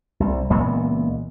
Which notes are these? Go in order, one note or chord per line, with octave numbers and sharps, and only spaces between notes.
C2
C#2 A#2 E3 B3